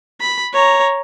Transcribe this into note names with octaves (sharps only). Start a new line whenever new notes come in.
B5
C#5 A#5